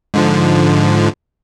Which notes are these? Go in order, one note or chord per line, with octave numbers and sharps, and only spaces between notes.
G#2 D3 F3